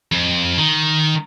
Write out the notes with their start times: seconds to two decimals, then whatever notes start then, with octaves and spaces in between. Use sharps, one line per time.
0.12 F2
0.58 D#3